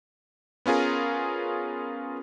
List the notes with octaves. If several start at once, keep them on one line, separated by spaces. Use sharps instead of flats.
B3 C#4 F4 G#4 A#4